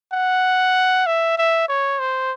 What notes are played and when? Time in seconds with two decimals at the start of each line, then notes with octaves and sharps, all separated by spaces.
0.13 F#5
1.06 E5
1.38 E5
1.68 C#5
1.99 C5